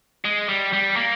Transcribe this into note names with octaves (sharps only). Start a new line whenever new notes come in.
G#3
G3
G3
A#3